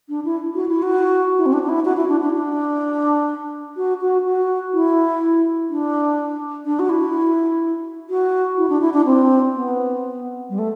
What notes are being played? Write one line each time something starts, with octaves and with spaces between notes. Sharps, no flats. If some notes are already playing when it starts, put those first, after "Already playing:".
D4
E4
F#4
E4
F#4
E4
C4
D4
D4
E4
F#4
E4
D4
D4
D4
F#4
F#4
F#4
E4
D4
D4
F#4
E4
F#4
E4
D4
E4
D4
C4
B3
G3
A3